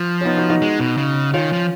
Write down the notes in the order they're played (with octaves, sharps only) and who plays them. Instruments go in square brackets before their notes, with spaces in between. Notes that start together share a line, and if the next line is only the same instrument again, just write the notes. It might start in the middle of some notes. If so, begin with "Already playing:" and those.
Already playing: [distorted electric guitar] F3
[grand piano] C#4
B3 D#4
D#4 F#4
D#4 F#4
[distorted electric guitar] G#3
B2
C#3
[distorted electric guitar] D#3 [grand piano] C#4 F4
[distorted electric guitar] F3